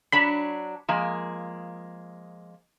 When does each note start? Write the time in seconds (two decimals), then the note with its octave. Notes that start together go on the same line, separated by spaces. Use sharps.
0.12 F#3 D4 C#5 B5
0.88 F3 G#3 A#3